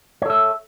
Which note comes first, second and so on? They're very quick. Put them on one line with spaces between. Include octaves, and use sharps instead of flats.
C#5 A4 E5